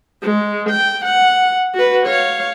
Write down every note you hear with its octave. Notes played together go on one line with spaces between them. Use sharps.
G#3
G5
F#5
F#4 B4
C#5 F5